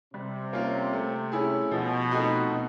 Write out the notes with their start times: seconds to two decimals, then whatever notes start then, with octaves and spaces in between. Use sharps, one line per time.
0.13 C3 G3
0.53 A#3 C#4 F4
0.93 A3
1.32 C#4 E4 G#4
1.71 B2 F3
2.11 A3 C4 D#4 F#4
2.51 B2